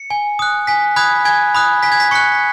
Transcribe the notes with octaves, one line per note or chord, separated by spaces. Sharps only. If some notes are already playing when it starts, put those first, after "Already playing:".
Already playing: C#7
G#5
D#6 F#6
G#5 B6
B5 D#6 F#6 G#6
G#5 G#6
B5 D#6 F#6
G#5 B6
G#6
B6
C#6 F#6 C#7